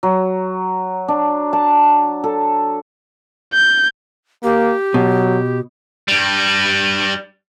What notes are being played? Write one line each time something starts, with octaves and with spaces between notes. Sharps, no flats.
F#3
D4
A5
A4
G6
A#3 G4
B2 F#3
G2 G3